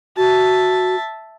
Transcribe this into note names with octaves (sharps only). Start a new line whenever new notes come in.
F#4 E5 A5